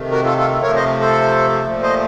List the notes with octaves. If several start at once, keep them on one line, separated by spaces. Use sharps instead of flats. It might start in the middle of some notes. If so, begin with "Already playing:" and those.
Already playing: C3 D#3 A3
F#4 A#4
F4 A4
F4 A4
C3 F3 A3 A#4 C#5
C5 D#5
A4 C5
A#2 F3 A3
C5 D#5